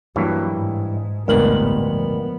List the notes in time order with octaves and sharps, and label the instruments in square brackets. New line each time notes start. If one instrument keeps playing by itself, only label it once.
[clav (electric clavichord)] G2 E3 C#5 [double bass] F#3 A#3
[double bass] G#2
[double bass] A1 B3 [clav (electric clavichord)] D2 G2 A#2 [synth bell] G#3 A#4 F#7
[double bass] F3 B3